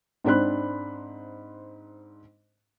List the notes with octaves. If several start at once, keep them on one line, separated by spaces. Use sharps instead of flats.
G#2 C4 D4 C5 B5 F#6